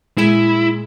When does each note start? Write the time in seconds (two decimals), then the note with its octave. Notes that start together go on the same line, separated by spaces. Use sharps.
0.18 A#2 G#3 E4 G#5